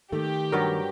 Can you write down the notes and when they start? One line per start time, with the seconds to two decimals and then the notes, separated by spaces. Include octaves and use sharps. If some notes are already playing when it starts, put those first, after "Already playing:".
0.12 D#3 A3 G4
0.52 G2 F#3 A#4